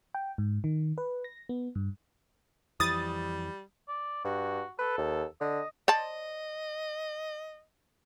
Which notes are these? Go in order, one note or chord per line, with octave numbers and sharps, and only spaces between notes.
G5
G#2
D#3
B4
A#6
B3
G2
F2 E3 G3 D#6 A6
D5
G2 F#4
A4 B4
D#2
D3 D#5
C5 D5 D#5 A5